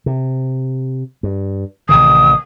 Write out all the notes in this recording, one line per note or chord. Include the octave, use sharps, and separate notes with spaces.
C3
G2
A1 C3 D#3 D#6